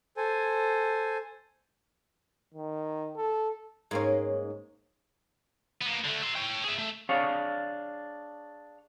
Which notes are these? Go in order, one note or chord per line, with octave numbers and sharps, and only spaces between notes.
A4 C5 G#5
D#3
A4
G#2 A#3 C#4
A#3 B3
D3 A3
E5 C6
C#5 G5
G#4 E5
A3
D4 G#4 C#5 F5